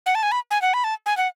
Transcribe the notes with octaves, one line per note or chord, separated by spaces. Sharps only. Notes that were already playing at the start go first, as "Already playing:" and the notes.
F#5
A5
G#5
B5
G#5
F#5
B5
A5
G#5
F#5